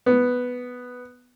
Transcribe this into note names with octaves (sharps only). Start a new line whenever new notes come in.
B3